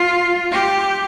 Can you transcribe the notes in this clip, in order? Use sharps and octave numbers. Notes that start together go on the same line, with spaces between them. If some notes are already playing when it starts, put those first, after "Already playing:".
Already playing: F4
G4